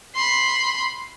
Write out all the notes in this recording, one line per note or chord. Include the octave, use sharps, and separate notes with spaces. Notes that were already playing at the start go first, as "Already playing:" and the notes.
B5 C6